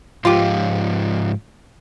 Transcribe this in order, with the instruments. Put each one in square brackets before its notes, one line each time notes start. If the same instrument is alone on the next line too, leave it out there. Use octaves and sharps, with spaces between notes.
[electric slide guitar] G#2 F3 [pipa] F4 G4